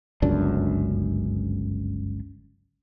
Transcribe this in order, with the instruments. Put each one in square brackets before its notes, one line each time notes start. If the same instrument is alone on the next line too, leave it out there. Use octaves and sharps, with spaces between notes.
[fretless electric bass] G1 C#2 F#2 D4